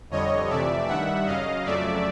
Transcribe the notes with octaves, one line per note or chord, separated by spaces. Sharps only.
F2 D3 G3 C#5 D#5
F2 C3 E3 A3 D5 E5
G2 D#3 G3 E5 F#5
F#2 C#3 F#3 D#5 F5
F2 C#3 F#3 A3 D5 E5